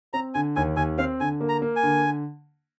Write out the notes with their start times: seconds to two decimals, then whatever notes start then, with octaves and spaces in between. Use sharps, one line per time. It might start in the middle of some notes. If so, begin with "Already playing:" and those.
0.13 C4 A#5
0.34 D3 G#5
0.56 D#2 G#5
0.77 D#2 G#5
0.98 C4 F5
1.20 D3 G#5
1.41 A#3
1.49 A#5
1.62 A#3
1.76 G#5
1.83 D3